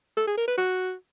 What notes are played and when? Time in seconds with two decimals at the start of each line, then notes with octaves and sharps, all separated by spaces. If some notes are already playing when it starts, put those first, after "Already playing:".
0.17 A4
0.27 G#4
0.37 A#4
0.47 B4
0.58 F#4